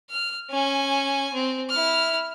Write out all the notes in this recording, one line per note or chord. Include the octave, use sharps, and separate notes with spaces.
F6
C#4 G#5
C4
E4 F6